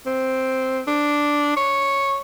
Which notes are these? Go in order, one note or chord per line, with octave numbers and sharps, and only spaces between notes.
C4
D4
C#5